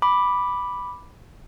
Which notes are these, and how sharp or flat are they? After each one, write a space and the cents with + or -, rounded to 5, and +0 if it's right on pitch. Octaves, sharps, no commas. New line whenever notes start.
B5 +0 D6 +0